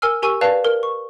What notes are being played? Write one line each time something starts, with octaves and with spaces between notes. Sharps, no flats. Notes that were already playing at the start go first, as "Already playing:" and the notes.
A#4 G#5 E6 F6
G4 A#4 G#5 C#6 E6 D#7
B4 D5 F5 G5 A5 F7
A#4
C#6